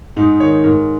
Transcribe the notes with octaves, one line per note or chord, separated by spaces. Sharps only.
G#2 D#4
D#3 C#5
G#2 A#4